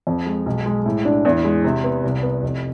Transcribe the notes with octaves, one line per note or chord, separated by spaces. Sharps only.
F2
G#3
B1
G#3
A2
D4
E2
G#3
C3
B3
C2
B3
F1